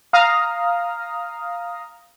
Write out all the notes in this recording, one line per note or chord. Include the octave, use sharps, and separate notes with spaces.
F5 A#5 D#6 F6